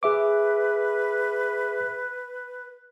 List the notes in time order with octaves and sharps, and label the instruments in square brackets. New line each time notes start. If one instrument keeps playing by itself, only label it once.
[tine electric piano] G#4 E5 D6 [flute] B4